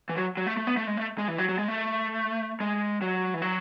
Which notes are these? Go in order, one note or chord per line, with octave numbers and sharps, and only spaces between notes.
E3
F#3
F#3
A3
A3
B3
A3
G#3
A3
G#3
E3
F#3
F#3
G#3
A3
G#3
F#3
E3
F#3